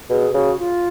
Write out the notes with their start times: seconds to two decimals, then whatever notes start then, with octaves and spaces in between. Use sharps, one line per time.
0.10 B2 G#4
0.34 C#3 F#4
0.58 F4